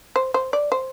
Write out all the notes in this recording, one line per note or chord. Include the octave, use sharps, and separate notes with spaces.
C5
C5
D5
C5